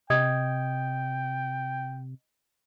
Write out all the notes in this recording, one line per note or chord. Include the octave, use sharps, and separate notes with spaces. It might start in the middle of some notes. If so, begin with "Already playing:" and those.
C3 D#5 G5 D#6 G#6